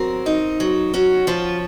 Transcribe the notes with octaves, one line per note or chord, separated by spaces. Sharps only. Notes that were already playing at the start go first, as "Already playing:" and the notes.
Already playing: F#3 C4 A#4
D#4
F#3
C#4 F#4
F3 F4